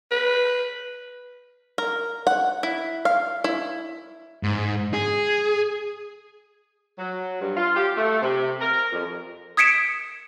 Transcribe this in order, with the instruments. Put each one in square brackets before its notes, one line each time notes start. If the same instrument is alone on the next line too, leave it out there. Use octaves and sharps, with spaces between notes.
[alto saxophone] B4
[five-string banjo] A#4
F#5
E4
F5
E4
[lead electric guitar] G#2
G#4
[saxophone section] F#3
G2
F4
G4
A3
C3
A#4
F2
[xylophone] D#6 G#6 B6 C#7 D7 E7